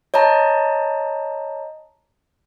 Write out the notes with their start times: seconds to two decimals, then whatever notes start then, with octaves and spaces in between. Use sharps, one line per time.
0.14 C#5 D#5 A5 A#5